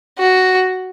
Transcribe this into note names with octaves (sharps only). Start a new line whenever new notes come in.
F#4